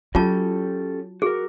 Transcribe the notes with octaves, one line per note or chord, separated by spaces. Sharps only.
F#3 C#4 F4 G4 A4 A5
F#4 G#4 A#4